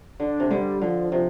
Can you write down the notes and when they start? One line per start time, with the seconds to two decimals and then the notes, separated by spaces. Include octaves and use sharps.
0.19 D3 D4
0.40 C3
0.51 D3 G3
0.82 D3 F3
1.11 C3 F3